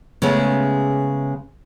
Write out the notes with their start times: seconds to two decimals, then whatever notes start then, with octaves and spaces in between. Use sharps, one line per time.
0.22 C#3 G#3 A3 B3 C#4